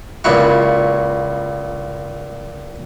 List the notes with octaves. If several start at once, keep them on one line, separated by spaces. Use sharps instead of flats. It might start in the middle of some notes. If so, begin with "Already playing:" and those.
C#2 A#2 E4 F#4